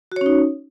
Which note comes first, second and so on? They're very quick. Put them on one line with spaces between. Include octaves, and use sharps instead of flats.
F#4 C#5 C#4 D#4